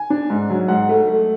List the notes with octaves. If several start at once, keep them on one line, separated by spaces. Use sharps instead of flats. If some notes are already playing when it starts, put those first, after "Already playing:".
Already playing: G#5
D4
G#2
F#3
G#2 F#5
A3
A3